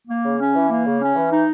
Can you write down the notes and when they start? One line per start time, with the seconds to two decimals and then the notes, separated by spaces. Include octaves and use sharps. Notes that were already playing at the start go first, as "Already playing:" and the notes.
0.08 A#3
0.24 C#3
0.40 C#4
0.55 E3
0.70 A#3
0.86 C#3
1.01 C#4
1.16 E3
1.32 D#4